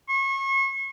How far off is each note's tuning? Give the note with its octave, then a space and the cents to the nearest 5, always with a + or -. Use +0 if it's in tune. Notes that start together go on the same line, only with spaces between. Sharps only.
C#6 -35